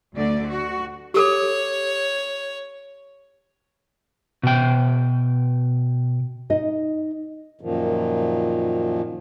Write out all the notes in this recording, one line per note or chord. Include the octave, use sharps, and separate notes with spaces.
D2 D3 A3 D5
F#4
G4 A4 C#5 D6
B2 G5
D#4 D#5
F#2 A#2 D#3 F3